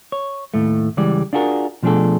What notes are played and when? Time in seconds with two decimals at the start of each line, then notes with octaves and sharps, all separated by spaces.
0.12 C#5
0.54 D#2 A2 A3
0.97 C#2 E3 G3 G#3 D5
1.33 D4 F4 F#4 G#4 A#4
1.83 B2 F3 A3 D4 G#4 A4